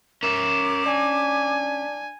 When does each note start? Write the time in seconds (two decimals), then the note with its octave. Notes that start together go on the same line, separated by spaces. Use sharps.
0.23 C#4 A#4 E5 D6
0.86 D4 G#5